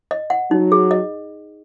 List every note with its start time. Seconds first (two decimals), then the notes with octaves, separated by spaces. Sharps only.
0.11 D#5
0.30 F#5
0.51 F#3 D#4
0.72 G#4
0.91 D#5